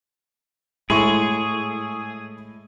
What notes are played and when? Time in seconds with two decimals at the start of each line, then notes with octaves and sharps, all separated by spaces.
0.90 A2 G#3 E4 G#4 A4 C#6